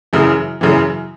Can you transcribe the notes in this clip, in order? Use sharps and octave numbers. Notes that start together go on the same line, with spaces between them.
F#2 C#3 E3
F#2 C#3 E3